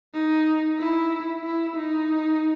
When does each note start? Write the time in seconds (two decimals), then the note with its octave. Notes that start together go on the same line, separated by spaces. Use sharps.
0.14 D#4
0.79 E4
1.44 E4
1.76 D#4